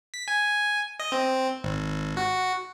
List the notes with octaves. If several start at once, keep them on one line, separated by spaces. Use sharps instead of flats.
B6
G#5
D#5
C4
G#1
F#4